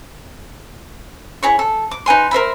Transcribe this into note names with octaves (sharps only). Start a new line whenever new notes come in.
E4 G#4 C#5 C#6
A4
D6
D#4 B4 G#5 C6
A#4 C5 E5 B5